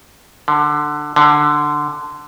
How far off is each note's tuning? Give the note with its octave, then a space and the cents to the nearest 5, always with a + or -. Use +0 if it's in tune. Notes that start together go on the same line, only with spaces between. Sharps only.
D3 +15
D3 +10